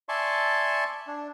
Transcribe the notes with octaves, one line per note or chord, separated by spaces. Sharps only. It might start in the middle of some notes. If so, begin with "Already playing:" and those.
D5 E5 G#5 A5 C6 C#6
D4